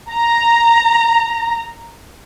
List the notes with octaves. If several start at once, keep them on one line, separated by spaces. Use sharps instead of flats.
A#5